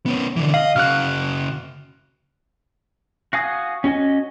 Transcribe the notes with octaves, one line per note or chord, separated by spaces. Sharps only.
B3 C#4
D3 E3
D#5 F5
C#3 F#4 F6 F#6
F#4 F5 G#5 D#6
C#4 F#4 D#5 G#5